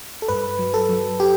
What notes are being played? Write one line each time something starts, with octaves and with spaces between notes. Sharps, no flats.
A4
G2 B4
F#3
A4
F#3
G4